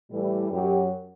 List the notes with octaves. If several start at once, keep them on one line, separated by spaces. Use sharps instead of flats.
A2 E3 G3
F#2 F#3 G4